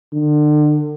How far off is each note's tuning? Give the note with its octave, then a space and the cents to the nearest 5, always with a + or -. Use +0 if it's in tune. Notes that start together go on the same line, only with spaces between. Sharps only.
D3 +35